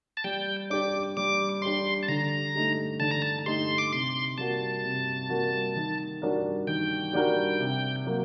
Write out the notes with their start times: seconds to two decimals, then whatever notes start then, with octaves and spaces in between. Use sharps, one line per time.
0.17 A5
0.24 G3 G5
0.70 D4 G4 D5 D6
1.17 G3 D6
1.62 D4 G4 D5 C6
2.03 A5
2.08 D3 A#5
2.55 A3 D#4 G4
3.00 D3 A5
3.11 A#5
3.22 A5
3.46 A3 D#4 G4 C6
3.78 D6
3.92 C3 C6
4.38 G3 A#3 F#4 A#4 A5
4.84 C3
5.29 G3 A#3 F#4 A#4
5.76 D#3
6.22 G3 D4 F#4 A#4
6.67 D#3 G5
7.13 G3 D4 F#4 A#4
7.60 C3
8.06 F#3 A#3 F#4